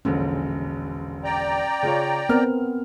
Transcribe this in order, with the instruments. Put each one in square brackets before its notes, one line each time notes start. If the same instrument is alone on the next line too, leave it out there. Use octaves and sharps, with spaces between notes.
[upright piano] E1 A#1 D3 [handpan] C#4
[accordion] D5 G5 A#5
[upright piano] C#3 F4 C#5
[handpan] B3 C4 A#4 [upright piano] F6